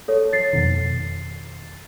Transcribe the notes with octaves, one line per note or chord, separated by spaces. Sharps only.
A4 C#5
A6 C7
F2 B2 D#3